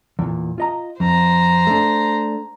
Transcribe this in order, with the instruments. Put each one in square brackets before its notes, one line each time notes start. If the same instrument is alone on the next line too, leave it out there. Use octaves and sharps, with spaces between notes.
[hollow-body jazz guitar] E2 A#2
F4 D#5 A#5
[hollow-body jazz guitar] F2 [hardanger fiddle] C5 A#5
[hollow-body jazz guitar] A3 D4